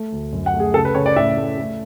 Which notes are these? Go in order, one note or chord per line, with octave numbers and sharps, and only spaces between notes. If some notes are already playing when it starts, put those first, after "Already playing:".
Already playing: A3
D2
F#2
F#5
A3
G#4
C#3 A4
B4
C#3 C#5
D5
A2 E5
A3
A3